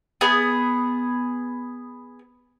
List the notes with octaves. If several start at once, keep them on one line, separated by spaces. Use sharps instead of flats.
B3 G#4